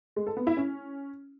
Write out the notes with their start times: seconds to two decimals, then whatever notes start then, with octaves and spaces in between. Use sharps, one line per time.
0.16 G#3
0.27 A4
0.37 B3
0.47 E4
0.57 C#4